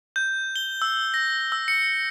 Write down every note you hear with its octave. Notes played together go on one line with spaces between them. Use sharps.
G6
G7
E6
A#6
E6
C#7